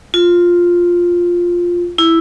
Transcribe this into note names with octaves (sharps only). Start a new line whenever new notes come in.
F4
E4